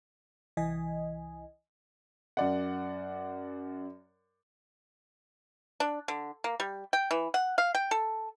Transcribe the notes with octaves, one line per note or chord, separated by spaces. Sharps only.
C2 E3 D#5 G#5
F#2 D5 F#5
D4
D3
A#3
G3
G5
E3
F#5
F5
G5
A4